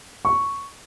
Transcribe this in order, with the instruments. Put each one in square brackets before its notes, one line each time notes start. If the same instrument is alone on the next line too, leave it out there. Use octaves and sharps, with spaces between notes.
[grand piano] C#6